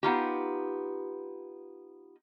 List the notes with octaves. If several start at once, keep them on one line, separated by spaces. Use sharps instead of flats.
B3 D#4 F4 G4